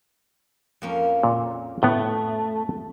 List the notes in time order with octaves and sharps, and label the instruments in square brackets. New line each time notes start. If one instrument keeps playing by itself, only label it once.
[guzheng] F2 A#3 C#4
[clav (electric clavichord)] A#2
[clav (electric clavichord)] A2 B3 [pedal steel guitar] A3